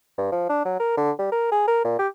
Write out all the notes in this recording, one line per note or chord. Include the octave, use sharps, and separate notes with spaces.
G2
F3
D4
F#3
A#4
D3
G3
A#4
G#4
A#4
A#2
G4